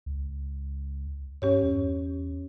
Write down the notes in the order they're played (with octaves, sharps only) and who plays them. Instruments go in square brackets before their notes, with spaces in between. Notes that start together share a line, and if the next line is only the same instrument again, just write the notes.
[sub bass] C#2
[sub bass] G2 [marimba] C#4 G4 C#5
[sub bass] E2